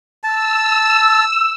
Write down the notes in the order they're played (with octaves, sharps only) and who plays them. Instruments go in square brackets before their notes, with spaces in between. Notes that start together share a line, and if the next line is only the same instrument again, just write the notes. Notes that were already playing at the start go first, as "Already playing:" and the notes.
[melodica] A5 [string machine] E6